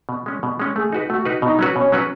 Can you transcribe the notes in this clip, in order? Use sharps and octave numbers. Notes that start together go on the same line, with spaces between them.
B2
G#3 C#4
B2
G#3 C#4
A3 G#4
D#4 F#4 B4
A3 F#4
D#4 F#4 B4
B2 D#4
F#3 C#4 F#4 B4
B2 C#4
F#3 C#4 F#4 B4